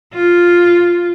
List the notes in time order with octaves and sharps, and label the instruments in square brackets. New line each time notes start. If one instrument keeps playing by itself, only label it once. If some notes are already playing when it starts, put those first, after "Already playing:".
[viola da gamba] F4